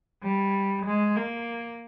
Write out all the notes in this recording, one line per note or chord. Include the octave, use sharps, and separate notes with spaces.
G3
G#3
A#3